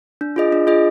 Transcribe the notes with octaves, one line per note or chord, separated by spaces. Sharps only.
D4
F4 G#4 D#5
D4
F4 G#4 D#5